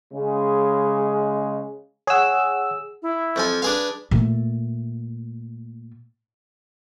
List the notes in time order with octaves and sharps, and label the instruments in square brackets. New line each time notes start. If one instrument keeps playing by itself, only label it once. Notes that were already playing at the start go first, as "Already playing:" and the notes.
[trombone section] C#3 G#3
[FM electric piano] G#4 E6 [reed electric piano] C#5 F#5
[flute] E4
[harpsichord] F2 F3 G#5
[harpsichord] D4 G#4 F5 [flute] B4
[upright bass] A#2 A3